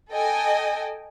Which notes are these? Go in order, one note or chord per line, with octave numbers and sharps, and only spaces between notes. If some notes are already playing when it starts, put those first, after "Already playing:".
A4 D#5 G5 G#5